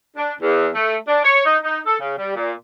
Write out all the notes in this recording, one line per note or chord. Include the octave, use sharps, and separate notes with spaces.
D4
E2
A3
D4
C#5
D#4
D#4
A4
C#3
G3
A#2